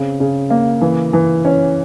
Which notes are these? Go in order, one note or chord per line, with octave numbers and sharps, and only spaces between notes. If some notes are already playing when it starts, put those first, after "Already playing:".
Already playing: C#3 C4
C#3
A#3
E3
E3
C#4